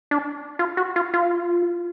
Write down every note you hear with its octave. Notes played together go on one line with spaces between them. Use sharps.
D4
F4
F#4
F4
F4